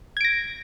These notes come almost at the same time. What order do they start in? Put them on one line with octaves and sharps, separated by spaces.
G#6 D7 A#6